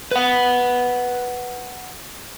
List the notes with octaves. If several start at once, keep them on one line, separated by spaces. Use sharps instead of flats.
B4 F#5